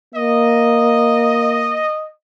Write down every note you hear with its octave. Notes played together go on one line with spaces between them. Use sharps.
A#3 D#5